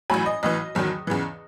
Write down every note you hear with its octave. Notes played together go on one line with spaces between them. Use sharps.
A1 A2 F#3 G#5 B5
D#5
B1 A2 E3 D#5
F#1 E2 D#3 F#3
E2 C#3 E3